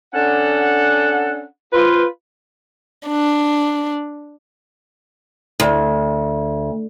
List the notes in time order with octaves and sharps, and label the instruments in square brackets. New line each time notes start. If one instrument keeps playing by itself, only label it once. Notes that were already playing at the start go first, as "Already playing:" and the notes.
[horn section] C#4 D4 A4 F#5
F4 B4 C5
[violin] D4
[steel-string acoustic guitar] D2